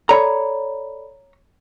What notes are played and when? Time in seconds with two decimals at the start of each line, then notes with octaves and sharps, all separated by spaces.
0.09 A4 C#5 D5 A#5 B5